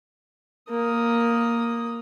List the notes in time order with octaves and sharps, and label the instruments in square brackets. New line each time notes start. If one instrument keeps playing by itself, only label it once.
[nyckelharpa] A#3 D#6